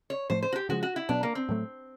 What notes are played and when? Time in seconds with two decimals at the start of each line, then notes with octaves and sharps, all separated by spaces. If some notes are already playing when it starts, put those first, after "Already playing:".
0.10 C#5
0.30 A2 F3 A3 C5
0.43 C5
0.53 F#4
0.56 G4
0.69 C#3 F3 G#3 F#4
0.83 F#4
0.96 E4
1.09 B2 F#3 B3 D4
1.23 A#3
1.35 C4
1.49 A2 F#3 A3